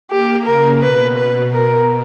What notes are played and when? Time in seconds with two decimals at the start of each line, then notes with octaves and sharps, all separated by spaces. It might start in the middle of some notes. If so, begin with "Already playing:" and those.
0.11 A#3 G4
0.46 C#3 A#4
0.82 B2 B4
1.17 B4
1.53 A#4